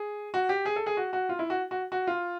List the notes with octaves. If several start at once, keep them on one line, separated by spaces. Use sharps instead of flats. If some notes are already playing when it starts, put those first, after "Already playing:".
Already playing: G#4
F#4
G4
G#4
A4
G#4
F#4
F#4
F4
E4
F#4
F#4
F#4
F4